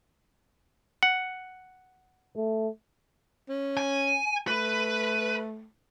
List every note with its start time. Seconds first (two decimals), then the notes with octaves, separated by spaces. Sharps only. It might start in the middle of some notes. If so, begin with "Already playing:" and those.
1.03 F#5
2.36 A3
3.49 C#4
3.77 G#5
4.48 A3 B4